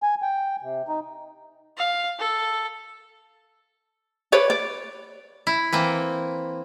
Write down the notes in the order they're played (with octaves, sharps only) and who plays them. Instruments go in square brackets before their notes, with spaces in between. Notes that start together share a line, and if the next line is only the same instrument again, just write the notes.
[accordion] G#5
G5
C3
D#4
[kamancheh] F5
A4
[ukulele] B4 C#5 D5
D5
[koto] E4
E3 A#3 C4